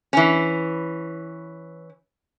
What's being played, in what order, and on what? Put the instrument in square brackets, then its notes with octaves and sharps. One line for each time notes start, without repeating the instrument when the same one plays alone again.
[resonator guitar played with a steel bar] E3 C#4